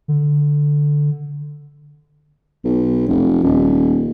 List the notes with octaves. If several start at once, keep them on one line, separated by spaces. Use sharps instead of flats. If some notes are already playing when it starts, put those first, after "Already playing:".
D3
B1
F1
D#1